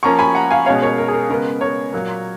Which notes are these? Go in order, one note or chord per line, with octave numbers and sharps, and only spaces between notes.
F3 A#3 C#4 A#5 C#6
G#5 B5
F#5 A#5
F5 G#5
B2 G#3 C#4 C#5 F5
A#4 C#5
A#4
G#4
A#4
C#3 G#3 B3 A#4
A#4 C#5
A#2 F#3 A#3